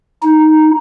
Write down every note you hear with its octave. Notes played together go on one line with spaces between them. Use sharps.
D#4